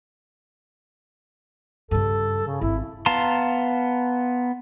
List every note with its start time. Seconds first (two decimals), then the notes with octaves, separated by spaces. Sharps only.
1.91 G2 C#3 A4
2.47 C#3
2.61 G#1 E4
3.06 B3 F5 A5 A#5 C6